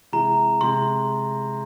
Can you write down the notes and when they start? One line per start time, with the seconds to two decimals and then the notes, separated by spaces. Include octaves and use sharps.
0.12 C3 E3 G#3 A#5
0.61 C3 E3 G#3 C6